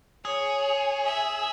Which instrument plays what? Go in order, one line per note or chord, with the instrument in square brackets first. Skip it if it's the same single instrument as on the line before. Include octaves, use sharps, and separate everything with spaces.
[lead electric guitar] G#4 [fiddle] C#5
[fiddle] E5